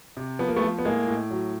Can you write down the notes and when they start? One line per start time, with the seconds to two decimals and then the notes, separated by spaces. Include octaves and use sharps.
0.17 C3
0.39 F3 B3
0.48 A#3
0.56 A3 B3
0.62 F3
0.79 B3
0.85 A2 G#3 A#3
1.08 A2
1.31 F#3